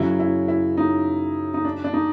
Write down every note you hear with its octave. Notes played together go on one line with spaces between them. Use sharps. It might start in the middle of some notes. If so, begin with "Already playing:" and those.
Already playing: F#2 C#3 F#3 E4
E4
E4
D#4
D#4
D4
D4
D#4